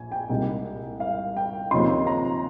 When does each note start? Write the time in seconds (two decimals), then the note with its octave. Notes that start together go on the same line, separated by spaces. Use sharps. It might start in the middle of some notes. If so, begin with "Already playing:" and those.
Already playing: A#1 G#5
0.12 G5
0.29 C2 A#2 G#3 D#4
1.00 F5
1.37 G5
1.71 D#2 C#3 F3 C4 D#4 C6
2.07 A#5